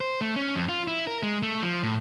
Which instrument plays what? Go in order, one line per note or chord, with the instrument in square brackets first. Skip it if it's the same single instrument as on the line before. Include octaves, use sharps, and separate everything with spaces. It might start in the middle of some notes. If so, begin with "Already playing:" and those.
[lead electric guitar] C5
A3
C#4
F2
F4
E4
A#4
G#3
A3
F3
A2